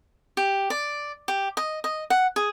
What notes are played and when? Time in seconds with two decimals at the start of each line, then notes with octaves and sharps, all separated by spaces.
0.37 G4
0.70 D5
1.28 G4
1.57 D#5
1.84 D#5
2.10 F#5
2.36 G#4